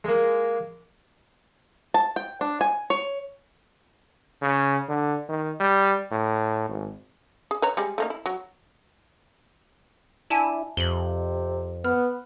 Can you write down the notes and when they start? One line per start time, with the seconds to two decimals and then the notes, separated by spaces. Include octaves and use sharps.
0.04 G#3 A#3
1.94 A5
2.16 G5
2.41 D4
2.61 G#5
2.90 C#5
4.42 C#3
4.89 D3
5.29 D#3
5.60 G3
6.12 A2
6.69 G#1
7.51 G#4
7.62 B4 C#5 A#5
7.77 G3 G#3
7.98 A3 A#3 D#4
8.10 E4
8.26 F#3
10.30 D4 E4 G#5 A5 E7
10.77 F2 C3 F#7 G7
11.85 B3 B4 F6